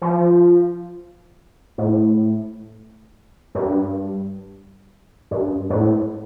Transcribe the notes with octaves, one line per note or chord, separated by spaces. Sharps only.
F3
A2
G2
G2
G2
A2